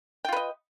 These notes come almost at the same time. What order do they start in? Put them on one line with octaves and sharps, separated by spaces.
G5 F4 B4 D#5